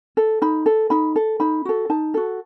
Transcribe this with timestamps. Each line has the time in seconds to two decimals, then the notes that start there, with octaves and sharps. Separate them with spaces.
0.17 A4
0.42 D#4 B5
0.66 A4
0.90 D#4 B5
1.16 A4
1.40 D#4 B5
1.65 F#4 A4
1.90 D#4 A5
2.14 F#4 A4